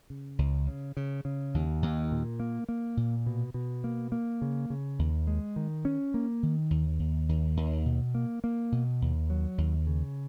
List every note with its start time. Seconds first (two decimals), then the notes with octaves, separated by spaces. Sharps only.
0.10 C#3
0.39 C#2
0.67 C#3
0.97 C#3
1.25 C#3
1.54 D#2
1.82 D#2
2.12 A#2
2.40 A#3
2.69 A#3
2.97 A#2
3.26 B2
3.54 B2
3.84 A#3
4.12 A#3
4.42 C#3
4.70 C#3
4.99 D#2
5.27 G#3
5.56 D#3
5.85 C#4
6.14 A#3
6.43 D#3
6.70 D#2
6.99 D#2
7.29 D#2
7.57 D#2
7.86 B2
8.15 A#3
8.44 A#3
8.72 B2
9.02 D#2
9.30 F#3
9.58 D#2
9.87 C#3